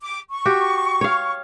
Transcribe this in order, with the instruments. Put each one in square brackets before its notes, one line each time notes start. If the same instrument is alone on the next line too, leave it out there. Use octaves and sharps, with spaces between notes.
[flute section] D6
C#6
[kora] F#4 G4
C#5 F5